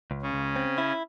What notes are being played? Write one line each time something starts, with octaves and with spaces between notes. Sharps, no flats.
C#2
C#3 C#4
C#2
C4
E4